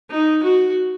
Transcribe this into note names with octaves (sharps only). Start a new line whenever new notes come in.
D#4
F#4